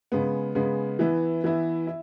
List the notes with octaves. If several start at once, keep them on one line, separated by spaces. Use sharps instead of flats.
C#3 G#3 B3
C#3 G#3 B3
E3 B3 E4
E3 B3 E4
E4